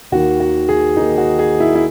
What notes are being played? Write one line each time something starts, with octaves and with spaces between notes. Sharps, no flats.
D#2 D#3 A#3 F#4
F#4
G#4
D#2 D#3 A#3 D#4
F#4
G#4
E4
E4